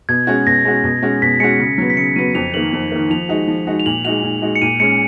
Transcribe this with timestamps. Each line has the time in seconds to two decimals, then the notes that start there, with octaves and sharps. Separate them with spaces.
0.09 B2 G#6
0.27 G#3 C#4 F#4
0.47 B2 A#6
0.65 G#3 C#4 F#4
0.84 B2
1.02 G#3 C#4 F#4
1.22 B2 B6
1.40 G#3 C#4 F#4 C#7
1.59 C#3
1.78 F#3 B3
1.90 B6
1.97 C#3 C#7
2.16 F#3 B3 D#7
2.35 F2 F7
2.54 D#3 A#3 F#7
2.73 F2
2.92 D#3 A#3
3.10 F3 F7
3.29 G#3 D#4 F#4
3.47 F3
3.67 G#3 D#4 F#4
3.80 F7
3.86 A#2 F#7
4.05 G#3 D#4 F#4 F7
4.23 A#2
4.42 G#3 D#4 F#4
4.55 C#7
4.62 A#2 D#7
4.80 G#3 C#4 C#7